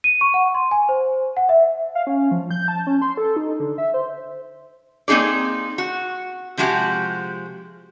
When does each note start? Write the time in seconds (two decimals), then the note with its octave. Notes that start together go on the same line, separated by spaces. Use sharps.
0.04 D#7
0.21 C#6
0.34 F#5
0.55 C6
0.71 G#5
0.89 C5
1.37 F#5
1.49 E5
1.95 F5
2.07 C#4
2.31 F3
2.51 G6
2.68 A5
2.87 C#4
3.02 C6
3.17 A4
3.36 D#4
3.60 D3
3.78 E5
3.94 C5
5.08 A#3 C4 D#4 G#4 D5
5.78 F#4
6.57 C3 F3 G#3 F#4 G4